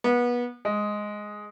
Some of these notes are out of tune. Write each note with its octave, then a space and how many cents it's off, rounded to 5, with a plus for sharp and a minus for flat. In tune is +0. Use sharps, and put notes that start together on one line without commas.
B3 -25
G#3 +5